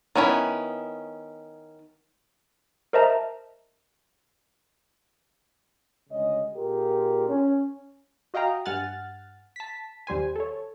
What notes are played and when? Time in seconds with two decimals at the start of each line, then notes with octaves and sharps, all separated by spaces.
0.15 D#3 B3 C#4 D#4 E4
2.93 A#4 C5 D#5 E5 A5 A#5
6.10 D2 C#3 G#3 C#5 D#5
6.55 A#2 F4 G4 G#4 A#4
7.28 C#4
8.34 F#4 D#5 F5 G5 A#5
8.66 G2 F#5 G#5 F6 F#6 A6
9.56 A5 B6
10.07 D#2 G3 C5 G#5
10.35 A4 C#5